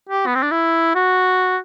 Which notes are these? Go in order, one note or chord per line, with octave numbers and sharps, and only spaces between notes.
G4
B3
C4
D4
E4
F#4